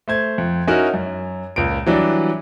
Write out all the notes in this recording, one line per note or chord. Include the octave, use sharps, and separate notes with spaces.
A3 C5 G#6
F2
C#4 D#4 E4 F#4 A#4 D#5
F#2
C#2 A#2 D7
E3 F#3 G3 D4